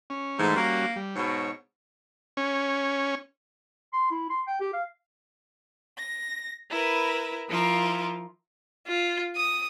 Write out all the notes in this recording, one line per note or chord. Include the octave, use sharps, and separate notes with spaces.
C#4
G#2 E3 A3
G3 A#3 C#4 F#4
G3
G#2 B2 C#5
C#4
C6
E4
C6
G5
G4
F5
A#6
E4 A#4 B4
F3 E4 F4 A#4
F4
D#6